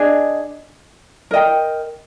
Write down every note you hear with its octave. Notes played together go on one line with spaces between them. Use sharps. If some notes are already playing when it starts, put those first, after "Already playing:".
Already playing: D4 G#4 D#5
A#4 D#5 G5